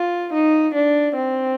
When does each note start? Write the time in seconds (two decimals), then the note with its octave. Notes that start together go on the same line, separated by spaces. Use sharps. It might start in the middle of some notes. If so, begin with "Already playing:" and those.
Already playing: F4
0.34 D#4
0.75 D4
1.16 C4